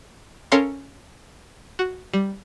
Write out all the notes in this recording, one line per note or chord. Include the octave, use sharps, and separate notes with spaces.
C#4 A4 A#4 C#5 F5 C6
F#4
G3